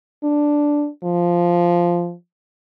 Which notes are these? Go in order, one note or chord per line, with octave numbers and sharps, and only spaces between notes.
D4
F3